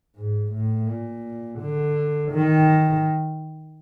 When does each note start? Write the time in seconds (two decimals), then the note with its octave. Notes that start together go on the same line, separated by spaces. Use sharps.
0.16 G#2
0.52 A2
0.87 A#2
1.59 D3
2.32 D#3